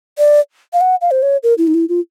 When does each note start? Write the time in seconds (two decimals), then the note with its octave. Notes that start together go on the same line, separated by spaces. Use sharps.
0.18 D5
0.73 F5
0.81 F#5
1.01 F5
1.11 C5
1.22 C#5
1.43 A#4
1.58 E4
1.67 D#4
1.74 E4
1.89 F4